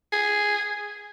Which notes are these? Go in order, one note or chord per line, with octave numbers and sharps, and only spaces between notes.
G#4